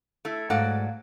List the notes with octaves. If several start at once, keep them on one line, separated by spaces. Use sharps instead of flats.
A3 E4
G#2 F#3 A3 A4 D5 F5 F#5